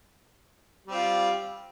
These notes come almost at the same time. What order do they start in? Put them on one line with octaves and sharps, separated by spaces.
G3 C4 F4